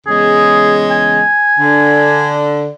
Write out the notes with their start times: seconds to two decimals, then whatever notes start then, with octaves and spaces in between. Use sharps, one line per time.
0.07 E2 C#3 G#3 G#4
0.91 G#5
1.59 D3